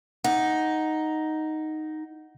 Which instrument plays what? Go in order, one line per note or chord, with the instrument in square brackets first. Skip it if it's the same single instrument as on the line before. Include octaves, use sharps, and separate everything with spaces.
[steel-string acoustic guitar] D#4 [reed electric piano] F#5